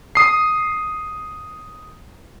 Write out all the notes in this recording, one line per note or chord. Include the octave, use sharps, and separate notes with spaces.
D#6 C7